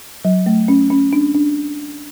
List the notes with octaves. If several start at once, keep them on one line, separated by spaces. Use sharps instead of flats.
F#3
A3
C#4
C#4
D4
D4